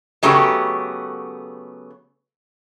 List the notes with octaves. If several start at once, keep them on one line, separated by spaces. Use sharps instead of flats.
C#3 F#3 A3 B3 G4